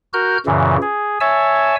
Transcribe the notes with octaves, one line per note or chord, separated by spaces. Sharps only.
F#4 A#4 F6 G6
F#2 A#2 C#3 E3
G#4
C#5 E5 G#5 A5 E6